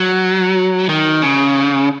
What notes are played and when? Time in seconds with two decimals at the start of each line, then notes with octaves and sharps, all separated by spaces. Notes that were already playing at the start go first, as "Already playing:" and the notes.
Already playing: F#3
0.89 D#3
1.22 C#3